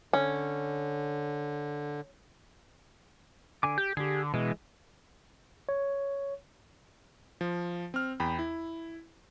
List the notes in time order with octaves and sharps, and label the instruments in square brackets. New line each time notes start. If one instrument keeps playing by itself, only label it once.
[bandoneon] D3 [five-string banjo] C#4
[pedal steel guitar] D3 G#5 D6
[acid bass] G4 [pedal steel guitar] G6
[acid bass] D3 [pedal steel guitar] G4 G#4
[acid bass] B2 [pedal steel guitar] E3 G#3
[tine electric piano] C#5
[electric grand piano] F3
C4 F6
E2 G5 B5
E4